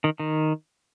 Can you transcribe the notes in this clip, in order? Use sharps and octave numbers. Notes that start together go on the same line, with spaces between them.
D#3
D#3